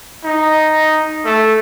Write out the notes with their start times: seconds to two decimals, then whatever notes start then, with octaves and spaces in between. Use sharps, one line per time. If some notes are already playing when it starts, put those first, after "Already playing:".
0.24 D#4
1.25 A3